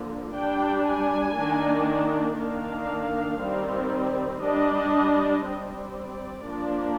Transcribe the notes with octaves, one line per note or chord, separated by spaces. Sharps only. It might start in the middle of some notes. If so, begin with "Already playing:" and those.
Already playing: D3 F3 A#3
G3 D4 G5
G#5
D#3 A#3 D4
D#3 A#3 D4 F5
D#3 G3 C4
G3 D4 D#5
G3 C4
D5
F3 A#3 D4